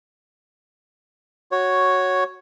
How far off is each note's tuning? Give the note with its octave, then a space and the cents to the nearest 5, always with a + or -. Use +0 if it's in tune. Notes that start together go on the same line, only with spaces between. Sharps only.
F#4 +0 C#5 +0